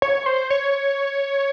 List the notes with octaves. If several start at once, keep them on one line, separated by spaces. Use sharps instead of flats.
C#5
C5
C#5